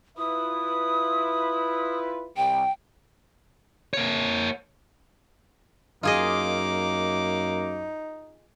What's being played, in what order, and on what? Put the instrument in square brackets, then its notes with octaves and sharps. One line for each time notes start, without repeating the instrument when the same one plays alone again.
[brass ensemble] E4 F4 B4 [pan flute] D#6
[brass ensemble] C2 [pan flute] G5
[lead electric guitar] A#3 C#5
[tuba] F#2 [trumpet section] A#3 D6 [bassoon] D#4 [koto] F4 G#4 D#5